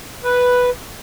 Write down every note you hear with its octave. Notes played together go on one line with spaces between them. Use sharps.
B4